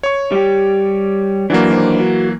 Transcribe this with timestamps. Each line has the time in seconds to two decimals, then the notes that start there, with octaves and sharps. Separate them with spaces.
0.03 C#5 C#6
0.32 G3 G4
1.50 E3 F#3 A#3 D4 F#4
1.70 D#3 D4 C5
2.00 F#4